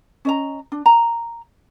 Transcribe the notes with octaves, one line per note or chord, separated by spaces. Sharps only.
C#4 D#5 A#5
D4
A#5